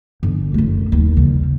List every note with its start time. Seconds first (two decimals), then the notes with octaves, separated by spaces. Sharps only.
0.23 G1 G2
0.54 F#2 A3
0.92 D#2
1.17 C#3 G3